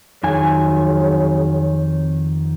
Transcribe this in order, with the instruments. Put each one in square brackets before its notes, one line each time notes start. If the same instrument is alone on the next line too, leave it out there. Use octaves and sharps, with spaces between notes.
[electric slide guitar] F2 D#3 G#5 [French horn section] F#3 G#4 C#5